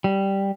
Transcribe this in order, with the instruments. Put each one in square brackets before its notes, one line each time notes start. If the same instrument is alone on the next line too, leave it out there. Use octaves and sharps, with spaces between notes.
[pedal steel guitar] G3